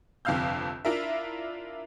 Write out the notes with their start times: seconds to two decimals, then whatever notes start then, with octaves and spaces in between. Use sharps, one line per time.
0.25 G1 F2 C3 F5 E6 G6
0.85 D4 E4 F4 A#4 E5